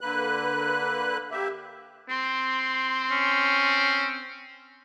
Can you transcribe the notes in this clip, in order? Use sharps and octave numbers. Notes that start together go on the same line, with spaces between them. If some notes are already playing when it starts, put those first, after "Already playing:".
D3 A#3 B4 F#6
A#3 G4 E5
C4 C6
C#4